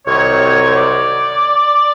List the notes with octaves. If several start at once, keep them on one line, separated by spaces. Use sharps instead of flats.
C2 C3 D#3 F#3 C#5
D5